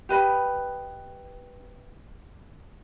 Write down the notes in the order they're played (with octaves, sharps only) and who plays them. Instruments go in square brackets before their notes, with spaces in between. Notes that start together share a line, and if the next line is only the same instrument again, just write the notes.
[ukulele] G4 B4 D#5 B5